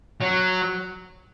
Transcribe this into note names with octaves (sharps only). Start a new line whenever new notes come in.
F#3